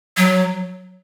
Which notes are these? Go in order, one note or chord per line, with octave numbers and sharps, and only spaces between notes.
F#3